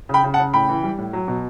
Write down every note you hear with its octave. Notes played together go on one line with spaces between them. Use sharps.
C#3 G5 B5
C#3
F#5 A5
C#3
A2 G5 B5
E3
G3
A2
F#3
B2